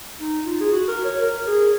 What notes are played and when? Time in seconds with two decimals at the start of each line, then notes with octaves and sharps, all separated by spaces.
0.21 D#4
0.46 F4
0.60 G#4
0.72 F#4
0.88 A#4
1.04 C#5
1.22 A#4
1.47 G#4